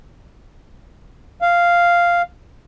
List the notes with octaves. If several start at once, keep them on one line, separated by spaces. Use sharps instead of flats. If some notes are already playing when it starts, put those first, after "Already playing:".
F5